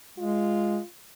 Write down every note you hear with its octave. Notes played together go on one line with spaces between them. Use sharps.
G#3 F4